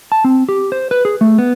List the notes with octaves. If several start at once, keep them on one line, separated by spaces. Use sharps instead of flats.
A5
C4
G4
C5
B4
G#4
A3
B3